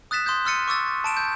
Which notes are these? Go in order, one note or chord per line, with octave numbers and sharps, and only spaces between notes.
D#6 F#6 A6 B6 E7
C6 D#6 F#6 G6
C6 E6 F6 A6 C#7 D#7
C#6 D6 E6 A6
A5 D7 E7
G6